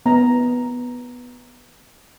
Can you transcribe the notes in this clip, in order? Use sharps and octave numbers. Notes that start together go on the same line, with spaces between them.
B3 A#5